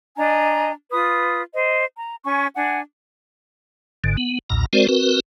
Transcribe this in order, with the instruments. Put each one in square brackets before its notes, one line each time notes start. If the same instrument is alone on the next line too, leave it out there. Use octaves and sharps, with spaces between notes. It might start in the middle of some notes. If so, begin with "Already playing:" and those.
[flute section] D4 D#5 G#5 A#5
F4 B4 D#6
C5 D#5
A#5
C#4 G#5 C#6
D4 F#5 G#5
[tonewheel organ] G#1 G#2 D3
B3
B1 E2 A#2 A#5
G#3 C4 F#4 A#4 C5 D5
C4 F#4 A#4 B4